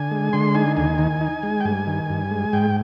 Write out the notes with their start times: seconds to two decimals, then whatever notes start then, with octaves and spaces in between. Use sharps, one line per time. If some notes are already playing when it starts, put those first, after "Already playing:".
Already playing: D3 G#5
0.11 G#3
0.33 D3 C6
0.55 D#4 G#5
0.77 D#2 G#5
0.98 D#3
1.21 D#4
1.43 G#3
1.60 G5
1.65 G2 G#5
1.87 D#3
2.10 G2
2.31 G#3
2.53 G#2 G5